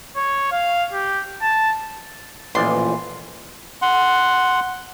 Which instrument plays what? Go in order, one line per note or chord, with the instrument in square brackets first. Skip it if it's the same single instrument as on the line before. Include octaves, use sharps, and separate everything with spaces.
[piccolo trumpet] C#5
F5
G4
A5
[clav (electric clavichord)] A1 D5 [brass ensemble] A#2 F3 [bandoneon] E3 [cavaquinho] C6
[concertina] F#5 C6